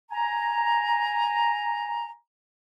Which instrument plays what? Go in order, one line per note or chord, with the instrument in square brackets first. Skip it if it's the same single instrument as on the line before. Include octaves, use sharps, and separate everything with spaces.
[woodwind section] G#5 A#5